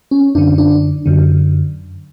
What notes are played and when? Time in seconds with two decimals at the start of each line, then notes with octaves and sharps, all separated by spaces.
0.11 C#4
0.35 F#2 D3 D4
0.58 D4
1.06 F#2 D3